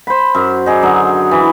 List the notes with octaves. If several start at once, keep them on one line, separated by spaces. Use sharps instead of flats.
C5 B5
F#2
D#4 G#4 D5
D3 F#3 D#4
E3